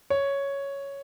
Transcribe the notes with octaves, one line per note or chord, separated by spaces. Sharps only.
C#5